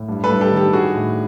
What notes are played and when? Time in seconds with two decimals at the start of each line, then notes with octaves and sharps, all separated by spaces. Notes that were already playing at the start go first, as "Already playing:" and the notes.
Already playing: A2
0.08 G2
0.24 A4 B4
0.29 G2
0.41 G4 A4
0.51 D#3
0.56 G4 A4
0.73 G3 F#4 G#4
0.95 A2